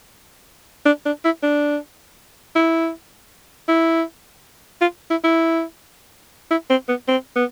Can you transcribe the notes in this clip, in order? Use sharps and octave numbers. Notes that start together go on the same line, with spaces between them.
D4
D4
E4
D4
E4
E4
F4
E4
E4
E4
C4
B3
C4
B3